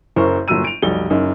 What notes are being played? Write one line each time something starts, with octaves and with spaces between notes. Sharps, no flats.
F#1 F#2 E4 A#4 C5 C#6
G1 A#2 F#3 E6 D#7
D7 F7
F1 B1 F#3 G3 A4 G7
F#1 F#2 D#4